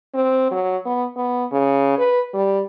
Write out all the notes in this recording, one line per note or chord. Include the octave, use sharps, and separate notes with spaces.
C4
F#3
B3
B3
C#3
B4
G3